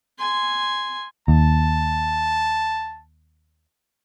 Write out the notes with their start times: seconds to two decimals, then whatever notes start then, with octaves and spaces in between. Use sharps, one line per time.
0.18 G#5 C6
1.28 D#2 A5